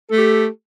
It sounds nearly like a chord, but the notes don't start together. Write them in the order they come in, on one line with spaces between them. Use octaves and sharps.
A4 A3 G4